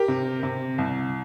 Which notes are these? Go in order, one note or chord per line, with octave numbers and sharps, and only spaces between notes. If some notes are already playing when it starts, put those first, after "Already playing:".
Already playing: G4 A#4
C3
C3
C2